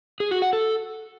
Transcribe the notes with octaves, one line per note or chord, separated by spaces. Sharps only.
G#4
F#4
F#5
A4